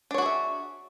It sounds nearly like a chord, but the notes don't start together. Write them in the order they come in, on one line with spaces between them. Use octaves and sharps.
D4 C#5 F#4 G#4 E5